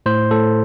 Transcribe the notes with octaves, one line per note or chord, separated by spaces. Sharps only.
A2 C5
A2 A4